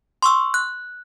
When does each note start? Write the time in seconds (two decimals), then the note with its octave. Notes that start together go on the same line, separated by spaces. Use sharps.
0.22 C6 C#6 E6
0.54 F#6